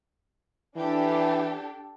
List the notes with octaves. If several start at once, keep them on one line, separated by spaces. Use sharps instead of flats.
E3 D4 G4 A4